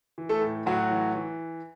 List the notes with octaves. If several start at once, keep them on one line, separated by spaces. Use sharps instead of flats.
E3
A3 A4
A2
A2 F#3 F#4
E3
E3